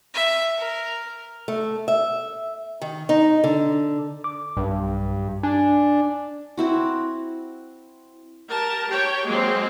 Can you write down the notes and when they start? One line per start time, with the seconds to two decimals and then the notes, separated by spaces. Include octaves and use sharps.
0.14 E5
0.58 A#4
1.48 A3
1.88 E5
2.82 D#3
3.09 D#4
3.44 D3
4.24 D6
4.57 B1 G2
5.43 D4 G#5
6.57 C4 E4 F#4
8.50 G4 A#4 A5
8.88 G4 C#5 G5
9.26 F#3 G#3 A#3 C4